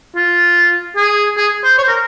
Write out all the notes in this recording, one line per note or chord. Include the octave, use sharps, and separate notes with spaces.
F4
G#4
G#4
C5
C#5
C5
A#4